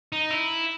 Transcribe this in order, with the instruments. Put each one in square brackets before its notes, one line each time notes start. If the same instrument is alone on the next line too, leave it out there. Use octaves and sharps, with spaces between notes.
[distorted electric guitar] D#4
E4